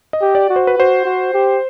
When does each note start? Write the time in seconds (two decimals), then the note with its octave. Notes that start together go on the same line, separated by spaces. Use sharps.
0.13 D#5
0.21 G4
0.35 D5
0.49 F#4
0.56 C5
0.67 B4
0.77 F#4 C5
1.05 F#4
1.33 G4